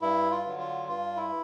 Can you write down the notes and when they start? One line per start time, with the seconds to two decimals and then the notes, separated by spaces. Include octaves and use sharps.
0.01 G2 E4
0.31 F4
0.45 D3 F#3
0.59 F4
0.88 G2 F4
1.17 E4